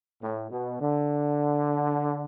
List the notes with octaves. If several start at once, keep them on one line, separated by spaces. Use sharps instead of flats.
A2
B2
D3